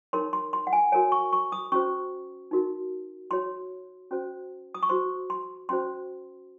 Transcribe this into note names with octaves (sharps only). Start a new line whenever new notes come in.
D#4 A#4 C#5 C6
C6
C6
F#5
G#5
F#4 A#4 C#5 G#5
C#6
C#6
D#6
C#4 F#4 C5 C#6
D#4 F#4 A#4
F#4 C#5 C6
C#4 F#4 C5
D#6
C#6
F#4 C5 C6
C6
C#4 F#4 C5 C6